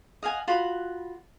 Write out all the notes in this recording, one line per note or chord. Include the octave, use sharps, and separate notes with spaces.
D#5 F5 F#5 G#5
F4 F#4 B5